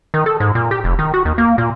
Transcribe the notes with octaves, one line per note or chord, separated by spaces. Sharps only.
D#3
A4
G#2
A#2
G4
F1
D#3
F#4
D#2
A#3
A#2